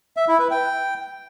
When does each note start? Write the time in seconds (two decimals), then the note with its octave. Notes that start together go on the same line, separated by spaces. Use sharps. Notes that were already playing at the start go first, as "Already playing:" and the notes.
0.17 E5
0.28 E4
0.39 B4
0.51 G5